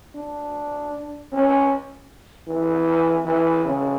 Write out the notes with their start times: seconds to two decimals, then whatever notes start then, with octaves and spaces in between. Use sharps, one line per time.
0.15 D4
1.32 C#4
2.48 E3
3.25 E3
3.65 C#3